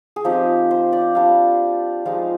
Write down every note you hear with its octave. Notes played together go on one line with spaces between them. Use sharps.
G#4
F3 C4 D#4 G4
C5
D5
G3 D4 F4 F5
F3 G#3 D#4 F5